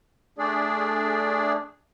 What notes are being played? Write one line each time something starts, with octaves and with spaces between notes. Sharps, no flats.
A3 D4 G#4 D5